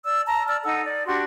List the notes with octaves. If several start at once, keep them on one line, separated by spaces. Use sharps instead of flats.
D5 E6
A5 A#5
D5 E6 F6
D#4 A4 F#5 E6
D5
D4 F#4 G4 C6